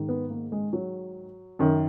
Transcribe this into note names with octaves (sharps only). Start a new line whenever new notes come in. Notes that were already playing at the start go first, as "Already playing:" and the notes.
Already playing: G#2 D#3
B3
A#3
G#3
F#3
F#2 D#3